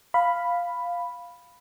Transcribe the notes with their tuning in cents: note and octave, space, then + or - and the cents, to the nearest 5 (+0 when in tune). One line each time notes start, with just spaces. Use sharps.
F5 +0 B5 +0